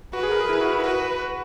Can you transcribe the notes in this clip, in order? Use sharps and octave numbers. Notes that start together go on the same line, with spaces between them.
F#4 B4
G#4
A#4
G#4
E4
F#4
E4
F#4 B4